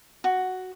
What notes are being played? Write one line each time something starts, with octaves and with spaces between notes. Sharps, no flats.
F#4